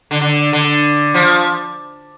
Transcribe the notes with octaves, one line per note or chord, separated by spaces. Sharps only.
D3
D3
D3
F3